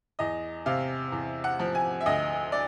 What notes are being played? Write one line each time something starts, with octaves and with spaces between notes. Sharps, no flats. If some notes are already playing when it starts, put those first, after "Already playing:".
E2 D#5
C3 F5
E2
F#5
F3
G#5
E5
D2 D#5
D5